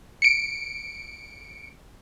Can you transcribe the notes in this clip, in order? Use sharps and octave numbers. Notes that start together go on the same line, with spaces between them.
C#7 D7